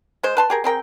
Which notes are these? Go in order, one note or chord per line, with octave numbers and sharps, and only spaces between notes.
G#3 C5
B4 A5 C6
G4 G#4 A#4
C4 G#4 A#4 G5